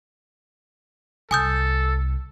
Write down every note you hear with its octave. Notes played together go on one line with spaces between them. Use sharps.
C2 A4 G#5 D#6 G6